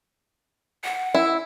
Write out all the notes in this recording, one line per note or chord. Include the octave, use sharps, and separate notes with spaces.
F#5
E4